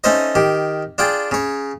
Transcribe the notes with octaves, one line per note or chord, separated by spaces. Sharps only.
A3 C#4 D#4 C5 D#5
D#3 G4
D4 F4 G#4 G5
C#3 C#5